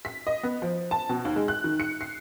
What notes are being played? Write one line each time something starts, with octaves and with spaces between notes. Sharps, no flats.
B6
D#5
B3
F3
A5
B2
D#2
G#3
F#6
D#3
C#7
C7